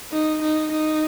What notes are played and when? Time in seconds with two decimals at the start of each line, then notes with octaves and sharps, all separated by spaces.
0.12 D#4
0.42 D#4
0.72 D#4